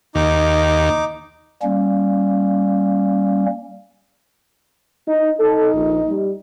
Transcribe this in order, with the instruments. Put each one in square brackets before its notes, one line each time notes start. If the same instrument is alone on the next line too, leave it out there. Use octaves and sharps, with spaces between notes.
[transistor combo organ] D#2 [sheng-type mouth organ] D#4 D6
[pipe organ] G3 A#3 C#4
[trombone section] D#4
[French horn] D#4 [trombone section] A4
[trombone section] A#1
G3